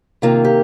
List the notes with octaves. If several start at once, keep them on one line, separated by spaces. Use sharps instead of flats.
C3 D#3 A#3 F4
G4